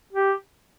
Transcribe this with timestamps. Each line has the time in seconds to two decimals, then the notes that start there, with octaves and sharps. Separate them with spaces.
0.13 G4